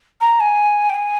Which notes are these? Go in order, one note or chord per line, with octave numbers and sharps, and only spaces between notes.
A#5
G#5
G5
G#5